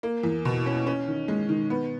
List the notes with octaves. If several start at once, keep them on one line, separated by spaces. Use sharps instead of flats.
A#3
E2
B2
C#4
C#4
D#3
G#3
D#3
B3